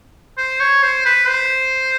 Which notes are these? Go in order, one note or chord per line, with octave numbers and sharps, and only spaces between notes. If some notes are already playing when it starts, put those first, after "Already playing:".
C5
C#5
C5
B4
C5